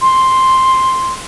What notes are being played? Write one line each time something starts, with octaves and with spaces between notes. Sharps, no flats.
C6